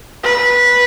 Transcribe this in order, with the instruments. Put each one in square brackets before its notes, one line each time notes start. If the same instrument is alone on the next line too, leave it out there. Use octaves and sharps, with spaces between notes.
[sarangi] B4